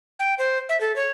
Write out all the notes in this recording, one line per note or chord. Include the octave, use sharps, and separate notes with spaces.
G5
C5
E5
A4
C#5